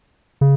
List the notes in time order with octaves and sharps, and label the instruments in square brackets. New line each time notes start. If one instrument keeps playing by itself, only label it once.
[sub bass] C#3